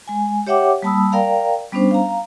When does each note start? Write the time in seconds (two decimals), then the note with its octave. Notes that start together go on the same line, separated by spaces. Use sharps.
0.08 G#3 G#5
0.47 G4 C#5 E5 F#5 G5 D6
0.82 G3 A#3 A5 B5 D#6 E6
1.12 A#4 D5 F5 G5 A#5
1.72 G3 B3 C#4 D4 C5
1.91 F5 A#5